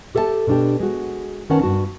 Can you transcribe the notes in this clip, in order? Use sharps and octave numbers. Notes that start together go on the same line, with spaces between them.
G4 A4 E5 F5 A5
B2 D4 G4
G#3 F#4
D#3 B3 C#4 A#4 F#5 A5
G2 F#4 A5